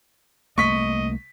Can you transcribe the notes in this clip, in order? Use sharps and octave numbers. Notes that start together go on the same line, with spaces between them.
C2 A3 A#3 D#5 C#6 B6